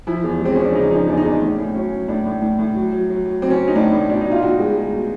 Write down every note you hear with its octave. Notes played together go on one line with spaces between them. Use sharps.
F3 E4
E2
G#3 C4
F3 C#4
D4
C#3 D#4
F3 D#4
E2 D4
D#4
E2 D4
A2 C#4
A2
F#3 C#4
F#3
A2 D4
A2
A2
A2
F#3
F#3
F#3
F#3
F#3 C4
C#4
F#3
D#4
A2 D4
A2
B2 D4
D#4
B2
F4
B2 F#4
G#3
G#3
B2